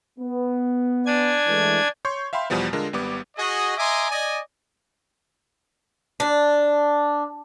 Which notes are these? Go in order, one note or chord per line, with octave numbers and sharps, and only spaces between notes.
B3
D4 G#5 G#6
E3 G#3 A3
C#5 C6 C#6 G6
E5 F5 G5 B5 C6
E2 B2 F3 G3 B3
D3 G#3 D4 F4 A#4
G#1 G3 B3 D6
F#4 G#4 D#5
D#5 E5 G#5 A#5 C6 D6
D5 D#5 G#5
D4